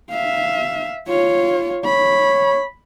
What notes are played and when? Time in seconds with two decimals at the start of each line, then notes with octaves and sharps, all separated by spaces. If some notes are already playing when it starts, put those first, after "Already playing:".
0.10 E5 F5
1.08 F4 C#5
1.85 C#5 B5